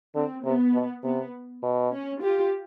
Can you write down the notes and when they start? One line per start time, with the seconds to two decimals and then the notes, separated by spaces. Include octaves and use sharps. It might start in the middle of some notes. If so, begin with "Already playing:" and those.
0.15 D3 C4
0.45 C3 B3
0.74 B2
1.03 C3 B3
1.63 B2
1.92 C#4
2.21 F4 G4